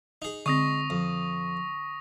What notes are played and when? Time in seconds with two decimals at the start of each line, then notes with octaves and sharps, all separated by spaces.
0.22 D#4 G#4
0.46 D3 G#3 C4 C#6 D#6 A#6
0.90 F2